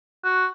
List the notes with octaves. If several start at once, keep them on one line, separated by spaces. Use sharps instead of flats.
F#4